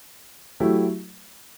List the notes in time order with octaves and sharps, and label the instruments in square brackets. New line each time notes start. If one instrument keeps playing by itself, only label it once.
[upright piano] F#3 A3 E4 G4